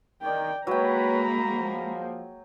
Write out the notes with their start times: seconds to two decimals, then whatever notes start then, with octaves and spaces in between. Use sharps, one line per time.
0.22 D#3 D5 G5
0.67 F#3 G#3 A#3 B4 C#5 G5 A#5 B5
1.50 F3